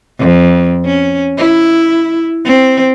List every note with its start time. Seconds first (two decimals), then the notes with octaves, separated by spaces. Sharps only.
0.19 F2
0.85 C#4
1.37 E4
2.45 C4